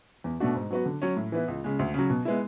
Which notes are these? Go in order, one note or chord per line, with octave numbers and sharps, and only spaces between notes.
E2
B2 A3 D4 F#4
G#2
F#3 B3 F#4
D3
F#3 C#4
A2
E3 B3 E4
C#2
C#3 G#3
D2
C#3 F#3
B2
G#3 B3 E4